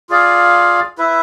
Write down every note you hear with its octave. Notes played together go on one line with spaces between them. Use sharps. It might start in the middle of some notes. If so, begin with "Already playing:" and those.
F4 G#4 D5 F5
E4 B4 E5